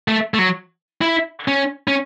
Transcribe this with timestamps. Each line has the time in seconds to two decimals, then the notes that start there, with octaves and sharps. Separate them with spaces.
0.08 A3
0.34 A3
0.39 F#3
1.01 E4
1.48 C#4
1.88 C#4